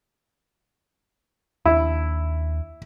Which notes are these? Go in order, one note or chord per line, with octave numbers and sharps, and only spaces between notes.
D#2 A3 D4 E4